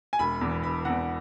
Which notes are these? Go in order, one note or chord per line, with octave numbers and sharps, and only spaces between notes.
G#5
E1 B5
E2 E3
E1 B5
E2 E3 F#5